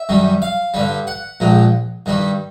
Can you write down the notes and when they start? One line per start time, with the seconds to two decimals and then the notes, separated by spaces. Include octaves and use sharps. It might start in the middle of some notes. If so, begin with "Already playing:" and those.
Already playing: E5
0.09 F#2 D#3 G3
0.42 F5
0.74 G2 D3 G3
1.07 F#5
1.40 A#1 A#2 F3 G#3
2.06 G2 D#3 G3